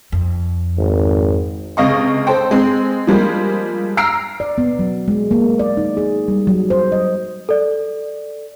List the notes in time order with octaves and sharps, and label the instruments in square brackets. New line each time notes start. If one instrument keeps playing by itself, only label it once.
[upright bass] F2
[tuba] G#1
[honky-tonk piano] C#2 C3 D#5 F5 C#6
A4 C5 G5
G#3 C4
F3 G3 G#3 A#3
A#5 E6 F6 C7 D7
[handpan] D5
B3
F#3
G#3
A#3
D5
D#4
G#4
G3
F#3
C5
D#5
[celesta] A4 D5